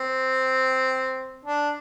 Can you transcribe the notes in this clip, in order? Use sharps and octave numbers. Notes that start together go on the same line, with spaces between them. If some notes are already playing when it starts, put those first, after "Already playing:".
Already playing: C4
D4